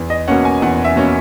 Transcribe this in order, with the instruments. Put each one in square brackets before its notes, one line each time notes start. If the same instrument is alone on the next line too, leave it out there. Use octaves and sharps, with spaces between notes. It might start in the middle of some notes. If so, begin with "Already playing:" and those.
Already playing: [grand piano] E2
D#5
B2 A#3 C#4 F#5
G#5
E2 F#5
E5
B2 A#3 C#4